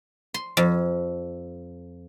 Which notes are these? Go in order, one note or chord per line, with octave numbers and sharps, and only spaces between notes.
C6
F2